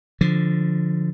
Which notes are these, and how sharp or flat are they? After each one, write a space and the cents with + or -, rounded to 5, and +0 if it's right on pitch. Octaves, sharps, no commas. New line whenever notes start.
D3 +0 F3 +0